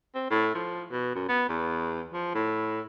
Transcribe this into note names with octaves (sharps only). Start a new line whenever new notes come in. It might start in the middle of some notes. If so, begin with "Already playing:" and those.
C4
A2
F3
B2
F#2
B3
E2
F3
A2